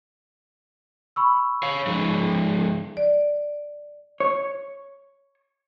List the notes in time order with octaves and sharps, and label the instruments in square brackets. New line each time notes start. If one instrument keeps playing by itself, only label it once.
[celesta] B5 C#6 E6
[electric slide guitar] C#5 F5
F3 G#3 D#4
[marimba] D5
[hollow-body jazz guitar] C#5